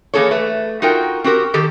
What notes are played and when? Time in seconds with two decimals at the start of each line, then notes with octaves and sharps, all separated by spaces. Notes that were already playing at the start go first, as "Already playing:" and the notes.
0.14 E3 A#3 G#4 A4 C#5
0.31 A3 B4
0.82 D#4 F4 F#4 A#4 G5
1.24 C4 F#4 G4 A#4
1.54 D#3 G4 A4